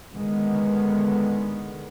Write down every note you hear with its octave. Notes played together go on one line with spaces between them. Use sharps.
D3 D#3 G#3 B3